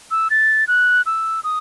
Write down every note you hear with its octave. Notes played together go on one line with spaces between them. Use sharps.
E6
A6
F#6
E6
D#6